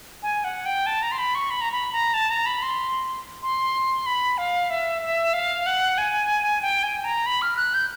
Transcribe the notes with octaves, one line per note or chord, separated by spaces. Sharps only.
G#5
F#5
G5
A5
A#5
C6
B5
C#6
B5
A#5
B5
A#5
A5
A#5
B5
C6
C6
B5
F5
E5
E5
F5
F#5
G#5
G5
G#5
A#5
B5
F6
F#6
G6